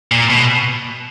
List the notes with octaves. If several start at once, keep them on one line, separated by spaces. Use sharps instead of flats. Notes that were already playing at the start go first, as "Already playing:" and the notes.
A#2
B2